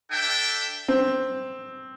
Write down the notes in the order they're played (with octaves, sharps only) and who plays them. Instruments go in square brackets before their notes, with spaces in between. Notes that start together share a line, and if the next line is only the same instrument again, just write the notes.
[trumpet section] D4 A4 E5 G5
[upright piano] C4